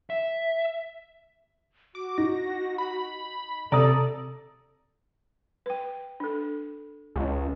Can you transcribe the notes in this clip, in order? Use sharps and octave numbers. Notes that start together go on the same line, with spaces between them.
E5
F#4 D6
D#4 A#6
B5
C3 A4 D5 A#5 D#6
B4 G5
D4 A4
C#2